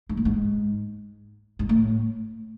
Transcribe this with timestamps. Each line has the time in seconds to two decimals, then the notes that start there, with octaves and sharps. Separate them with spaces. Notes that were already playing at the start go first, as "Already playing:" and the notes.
0.09 G#2
0.17 A2
0.25 G#2
1.59 G#2
1.69 A2